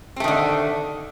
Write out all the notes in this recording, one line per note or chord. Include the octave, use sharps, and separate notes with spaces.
D3 D#3 A3 C4